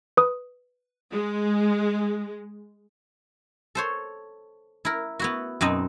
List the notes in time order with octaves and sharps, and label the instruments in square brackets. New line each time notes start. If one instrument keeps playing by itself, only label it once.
[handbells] B4 D#6
[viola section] G#3
[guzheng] A4 C5 C#5
E4 A#4
B3 E4 F#4
F#2 B2 B3 C4 D#4 D#5